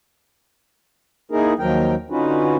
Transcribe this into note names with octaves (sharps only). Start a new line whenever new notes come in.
A#3 D#4 E4 G#4 A#4
D#2 D#3 F3 F#3 A#4 G5
D3 C#4 D#4 F4 F#4 B4